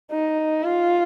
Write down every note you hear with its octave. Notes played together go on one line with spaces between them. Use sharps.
D#4
F4